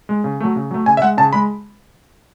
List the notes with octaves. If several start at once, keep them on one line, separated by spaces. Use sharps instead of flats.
G#3
C#3
F#3 A3
C#3
F#3 A3
C#3 G#5
E5
G#3 F#5
C#3 A5
G#3 B5